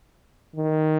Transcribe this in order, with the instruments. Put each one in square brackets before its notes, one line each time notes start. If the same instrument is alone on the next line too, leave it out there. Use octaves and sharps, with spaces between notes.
[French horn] D#3